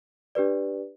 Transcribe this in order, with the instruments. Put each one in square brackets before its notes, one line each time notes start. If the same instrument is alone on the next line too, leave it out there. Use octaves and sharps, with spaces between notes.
[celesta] D4 G4 B4 D5